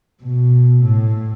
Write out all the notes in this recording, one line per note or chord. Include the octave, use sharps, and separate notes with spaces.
B2
A2